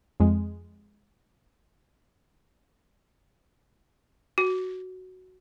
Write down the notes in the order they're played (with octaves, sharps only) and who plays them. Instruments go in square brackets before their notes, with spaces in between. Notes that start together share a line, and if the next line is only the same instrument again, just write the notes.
[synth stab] F2 G#3
[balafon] F#4